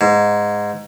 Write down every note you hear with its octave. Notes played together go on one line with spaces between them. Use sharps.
G#2